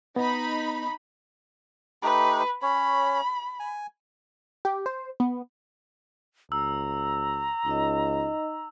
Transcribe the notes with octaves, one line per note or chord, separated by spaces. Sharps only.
B3 D#4 B5
A3 D#4 G4 B4
C#4 C#5 B5
G#5
G4
C5
B3
C#2 A#5 E6
C#2 D#4 D#5